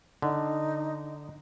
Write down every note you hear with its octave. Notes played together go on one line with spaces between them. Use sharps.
D3 D#4